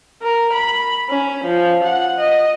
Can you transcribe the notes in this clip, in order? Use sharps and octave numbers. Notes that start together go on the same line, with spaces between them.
A#4
B5
C#4
F3
F#5
D#5